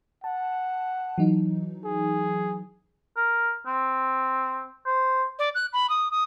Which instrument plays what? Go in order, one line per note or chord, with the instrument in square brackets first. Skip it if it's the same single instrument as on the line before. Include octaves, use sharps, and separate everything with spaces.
[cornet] F#5 [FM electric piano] A5
[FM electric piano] E3 F#3 D#4
[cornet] G#4
[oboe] A#4
C4
C5
[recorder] D5
F#6
B5
D#6
D#6